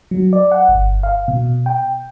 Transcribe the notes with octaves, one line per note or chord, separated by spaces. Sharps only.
F#3
D5
F#5
G1
F5
B2
G5